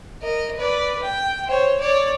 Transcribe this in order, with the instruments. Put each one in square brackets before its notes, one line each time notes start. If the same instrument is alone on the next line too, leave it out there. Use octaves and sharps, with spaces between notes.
[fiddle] A#4 D#5
B4 D5
G5
C5 C#5
C#5 D5